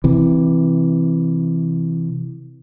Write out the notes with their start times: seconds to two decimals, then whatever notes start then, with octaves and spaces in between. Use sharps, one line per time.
0.04 C3 E3